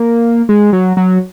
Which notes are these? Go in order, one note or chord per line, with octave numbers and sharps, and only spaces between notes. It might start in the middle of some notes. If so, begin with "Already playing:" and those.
Already playing: A#3
G#3
F#3
F#3